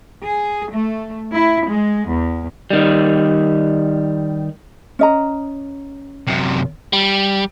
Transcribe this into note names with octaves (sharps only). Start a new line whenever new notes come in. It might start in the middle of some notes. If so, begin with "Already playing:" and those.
G#4
A3
E4
G#3
E2
D#3 G3
C#4 D#5 A#5
F#2 C3
G3